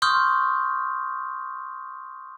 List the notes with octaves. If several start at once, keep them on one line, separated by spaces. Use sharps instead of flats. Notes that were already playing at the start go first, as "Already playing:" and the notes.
C6 C#6 D#6 F6 G6